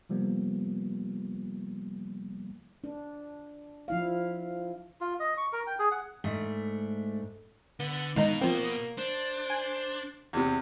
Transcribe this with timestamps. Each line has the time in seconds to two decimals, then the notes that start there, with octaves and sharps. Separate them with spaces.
0.09 C3 F3 G3 A#3 B3
2.84 D4
3.88 F3 E4 F5
5.01 F4
5.20 D#5
5.37 C#6
5.53 A#4
5.67 G5
5.79 G#4
5.91 F#5
6.24 G#2 A3 D4
7.80 D3 B3
8.16 G#2 B2 D#3 D#4 F5
8.41 F3 A#3 C4
8.98 D4 C5
9.50 G#5
10.33 E2 C3